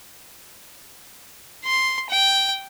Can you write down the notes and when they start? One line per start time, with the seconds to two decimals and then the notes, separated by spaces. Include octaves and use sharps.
1.65 C6
2.10 G5